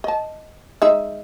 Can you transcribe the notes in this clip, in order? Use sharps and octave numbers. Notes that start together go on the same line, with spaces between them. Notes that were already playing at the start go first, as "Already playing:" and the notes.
D#5 A5
G#3 D#4 E5